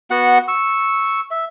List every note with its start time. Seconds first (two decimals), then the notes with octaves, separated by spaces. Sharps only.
0.11 B3 F#4 F#5
0.48 C#6 E6
1.31 E5